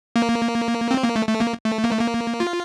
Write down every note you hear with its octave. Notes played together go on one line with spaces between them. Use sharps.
A#3
C4
A#3
A3
A3
A#3
A3
A#3
A3
A#3
F4